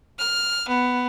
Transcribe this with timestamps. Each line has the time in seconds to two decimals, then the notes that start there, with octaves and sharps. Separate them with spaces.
0.19 F6
0.68 B3